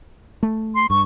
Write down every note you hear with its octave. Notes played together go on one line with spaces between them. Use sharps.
A3
C6
G2 C#6